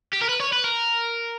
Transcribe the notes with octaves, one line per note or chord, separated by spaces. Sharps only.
G4
A#4
B4
C#5
B4
A#4